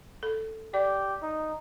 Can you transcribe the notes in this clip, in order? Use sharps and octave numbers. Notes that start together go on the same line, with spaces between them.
A4
G4 D5
D#4